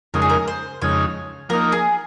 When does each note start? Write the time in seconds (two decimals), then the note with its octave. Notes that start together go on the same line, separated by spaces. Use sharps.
0.14 F2 C#3 G#3 D#4 A#4
0.22 G#4
0.30 A#4
0.48 C5
0.82 F2 C#3 G#3 D#4 C#5
1.49 F3 A#3 D#4 A#4
1.72 G#4